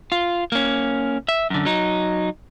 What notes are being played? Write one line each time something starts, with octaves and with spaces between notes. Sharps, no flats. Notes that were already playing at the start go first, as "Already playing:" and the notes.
F4
A#3 C#4
E5
F#2 D3
F#3 D#4